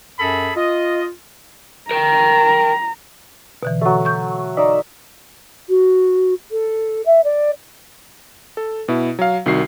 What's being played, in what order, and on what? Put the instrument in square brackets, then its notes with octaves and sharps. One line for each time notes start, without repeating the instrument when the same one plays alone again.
[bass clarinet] F#2 [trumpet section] G#4 A4 B5
[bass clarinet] F4 [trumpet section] D#5
[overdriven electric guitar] A#4 G5 [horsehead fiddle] A#5
[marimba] B2 D3 E3
[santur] F#3 A3
[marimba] C#6 G6
[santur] D#4 D5 E5
[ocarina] F#4
A4
E5
D5
[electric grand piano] A4
B2 E4
F#3 F5
C2 D#3 F#4 C7